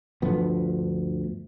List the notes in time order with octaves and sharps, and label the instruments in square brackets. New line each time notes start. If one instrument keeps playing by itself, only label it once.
[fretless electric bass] D2 G2 F3 B3